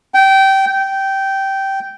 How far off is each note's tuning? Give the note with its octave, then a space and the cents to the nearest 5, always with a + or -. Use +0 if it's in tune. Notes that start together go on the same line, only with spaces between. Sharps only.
G5 -20
G5 -15